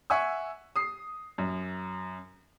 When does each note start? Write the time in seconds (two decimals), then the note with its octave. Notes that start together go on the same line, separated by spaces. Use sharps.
0.10 E5 F#5 G#5 C#6 E6
0.76 D#6 C7
1.38 F#2